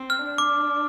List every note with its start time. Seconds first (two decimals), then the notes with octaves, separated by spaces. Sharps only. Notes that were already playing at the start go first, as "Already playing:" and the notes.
Already playing: C4
0.10 F6
0.24 D4
0.38 D6